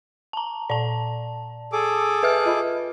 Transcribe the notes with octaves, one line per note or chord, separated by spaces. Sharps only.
A5 A#5
A#2 D5 A5
G#4 A4 D6
B4 E5 F6
F4 D#5 B5